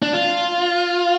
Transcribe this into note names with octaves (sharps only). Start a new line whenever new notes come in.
D4
F4